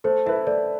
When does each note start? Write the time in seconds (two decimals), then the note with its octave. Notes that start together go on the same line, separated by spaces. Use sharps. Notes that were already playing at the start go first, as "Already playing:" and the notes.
0.04 A3 C5
0.26 E4 B4 E5
0.47 A3 D5